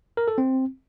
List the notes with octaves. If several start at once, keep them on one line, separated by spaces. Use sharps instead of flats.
A#4
A4
C4